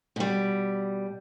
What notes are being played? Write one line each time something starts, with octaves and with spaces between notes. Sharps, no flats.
B2 G3